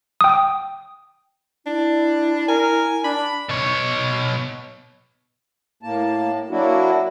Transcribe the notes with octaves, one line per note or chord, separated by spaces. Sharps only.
G5 D#6
D4 E4
A#4 G#5
D4 B5
B2 C#5
A2 A#3 A5
F#3 A#3 D4 E4 F#4